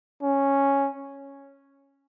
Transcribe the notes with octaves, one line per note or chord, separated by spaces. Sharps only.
C#4